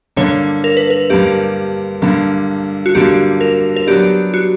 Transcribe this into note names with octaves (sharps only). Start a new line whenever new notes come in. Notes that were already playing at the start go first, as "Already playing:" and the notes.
G2 D3 A#3 C#5
A#4
B4
A#4
G2 D3 A#3 G4
G2 D3 A#3
F#4
G2 D3 A#3 G4
A#4
A#4
F#3 B3 D4 G4
F#4